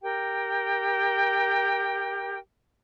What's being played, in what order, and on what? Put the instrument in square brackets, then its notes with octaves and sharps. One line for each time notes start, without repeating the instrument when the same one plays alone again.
[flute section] G4 A#4 G5